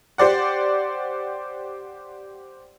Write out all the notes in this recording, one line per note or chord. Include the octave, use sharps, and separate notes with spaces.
G4 C5 D5 F#5